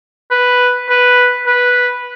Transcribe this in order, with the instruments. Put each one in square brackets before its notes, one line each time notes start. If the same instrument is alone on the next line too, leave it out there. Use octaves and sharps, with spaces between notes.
[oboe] B4
B4
B4